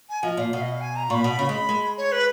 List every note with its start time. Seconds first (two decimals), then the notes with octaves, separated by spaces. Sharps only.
0.10 G#5
0.23 F3 D#5
0.37 A#2 F5
0.52 B2 F5
0.62 D#5
0.72 F5
0.81 G#5
0.96 A#5
1.10 A#2 C#6
1.15 B5
1.24 B2
1.39 C#3
1.49 G#3
1.69 G#3
1.97 C#5
2.12 B4